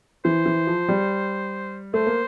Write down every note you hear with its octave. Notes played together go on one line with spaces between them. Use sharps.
E3 C5
E3
F3
G3
A3 C5
A#3